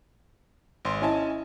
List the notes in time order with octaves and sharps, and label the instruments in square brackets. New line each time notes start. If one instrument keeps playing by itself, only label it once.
[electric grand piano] G#1 C6
[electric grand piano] C#4 G#5 A5 [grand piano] E4 D#5